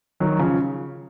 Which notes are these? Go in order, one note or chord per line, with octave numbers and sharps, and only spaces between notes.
D#3 F#3
C#3 F3